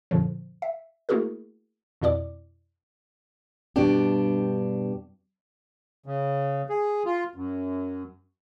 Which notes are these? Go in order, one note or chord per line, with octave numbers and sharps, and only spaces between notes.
F#2 A#2 D3 F3
E5
A3 A#3 E4 F#4 G#4 A#4
F2 B2 E4 D5 D6
G2 B2 D4 G4
C#3
G#4
F4
F#2